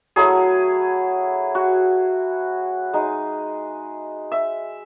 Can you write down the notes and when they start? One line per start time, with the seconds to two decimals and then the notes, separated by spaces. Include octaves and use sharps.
0.16 F#3 A3 E4 G#4
1.55 F#4
2.93 G#3 D#4
4.32 E5